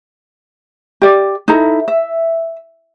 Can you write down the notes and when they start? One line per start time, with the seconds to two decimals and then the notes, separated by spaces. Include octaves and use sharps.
1.02 G4 D5
1.48 D#4 E4 A4 A#5
1.88 E5